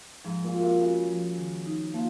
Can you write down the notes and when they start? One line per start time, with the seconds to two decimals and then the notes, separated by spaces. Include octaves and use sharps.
0.24 G#2 F3
0.44 A#2
0.53 F#4
0.62 C3
0.81 C#3 F#4
1.10 F3
1.38 D#3
1.66 D#4
1.93 F3 A#3